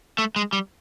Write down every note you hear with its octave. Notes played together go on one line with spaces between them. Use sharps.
A3
G#3
G3